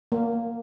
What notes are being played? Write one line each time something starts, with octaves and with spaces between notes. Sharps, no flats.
A#3